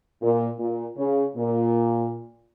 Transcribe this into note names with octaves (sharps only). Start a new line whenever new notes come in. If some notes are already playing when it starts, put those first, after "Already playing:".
A#2
A#2
C#3
A#2